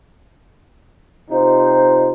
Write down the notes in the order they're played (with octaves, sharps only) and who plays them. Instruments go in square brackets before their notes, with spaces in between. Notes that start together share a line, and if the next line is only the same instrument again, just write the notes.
[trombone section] C3 D#4 F4 C5